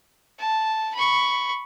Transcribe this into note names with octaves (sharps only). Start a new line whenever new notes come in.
A5
B5 C#6